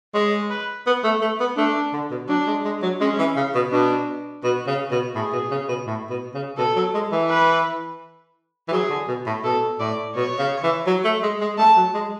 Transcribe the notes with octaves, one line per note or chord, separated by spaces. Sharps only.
G#3 C#5
B4
B3
A3
A3
B3
A3 D4
D3
B2
F#3 D4
G#3
G#3
F#3
G#3 C#4
E3
C#3
B2
B2 D4
B2 F#4
C#3
B2
A2 G#4
B2
C#3
B2
A2
B2
C#3
B2 A4
F#3
G#3
E3
B4
E3
F#3 G#4
D3
B2
A2
B2 A4
A2 D5
B2 C#5
C#3
E3
F#3
A3
G#3
G#3
A3 A5
F#3
G#3